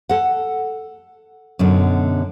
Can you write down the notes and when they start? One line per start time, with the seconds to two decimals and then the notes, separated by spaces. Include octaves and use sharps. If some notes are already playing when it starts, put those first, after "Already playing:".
0.09 A4 F#5
1.59 F#2 B2 D3